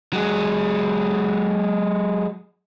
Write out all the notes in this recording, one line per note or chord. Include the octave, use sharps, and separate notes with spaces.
F#3 G#3